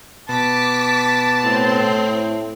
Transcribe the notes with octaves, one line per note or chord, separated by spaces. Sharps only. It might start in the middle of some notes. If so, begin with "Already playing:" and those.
B2 A5 D6 B6
A2 C4